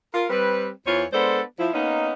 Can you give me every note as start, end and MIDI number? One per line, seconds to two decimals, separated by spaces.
0.14 0.26 65
0.14 0.26 70
0.30 0.69 55
0.30 0.69 60
0.30 0.69 71
0.87 1.04 40
0.87 1.04 52
0.87 1.04 65
0.87 1.04 72
0.87 1.04 73
1.13 1.42 56
1.13 1.42 59
1.13 1.42 62
1.13 1.42 69
1.13 1.42 72
1.13 1.42 74
1.59 1.70 53
1.59 1.70 64
1.73 2.13 58
1.73 2.13 59
1.73 2.13 61
1.73 2.13 63